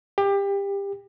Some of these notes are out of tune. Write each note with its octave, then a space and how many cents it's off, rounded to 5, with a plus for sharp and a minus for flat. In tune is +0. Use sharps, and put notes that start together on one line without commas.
G4 +25